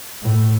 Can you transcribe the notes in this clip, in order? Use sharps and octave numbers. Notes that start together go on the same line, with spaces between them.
A2